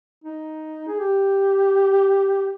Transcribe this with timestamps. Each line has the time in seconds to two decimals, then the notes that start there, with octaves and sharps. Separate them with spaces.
0.24 D#4
0.88 G#4
0.99 G4